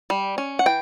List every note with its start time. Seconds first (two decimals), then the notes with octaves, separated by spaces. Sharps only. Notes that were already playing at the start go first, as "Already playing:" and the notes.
0.10 G3
0.38 C#4
0.59 F#5
0.66 E3 G5